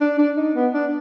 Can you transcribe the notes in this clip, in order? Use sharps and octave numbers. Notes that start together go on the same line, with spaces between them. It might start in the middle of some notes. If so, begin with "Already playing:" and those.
D4
D4
D#4
B3
D4